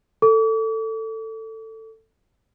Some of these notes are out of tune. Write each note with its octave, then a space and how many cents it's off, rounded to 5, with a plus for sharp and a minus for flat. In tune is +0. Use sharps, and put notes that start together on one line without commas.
A4 +15 D6 -45